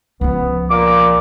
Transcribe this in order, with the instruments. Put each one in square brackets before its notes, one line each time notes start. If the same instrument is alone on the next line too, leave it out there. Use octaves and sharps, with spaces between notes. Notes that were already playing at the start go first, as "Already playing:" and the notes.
[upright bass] C#2 F3 [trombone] B3
[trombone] A#2 [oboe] D6